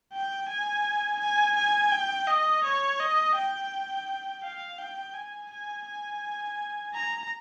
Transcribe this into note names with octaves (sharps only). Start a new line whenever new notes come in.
G5
G#5
G#5
G#5
G5
D#5
C#5
D#5
G5
F5
G5
G#5
G#5
G#5
A#5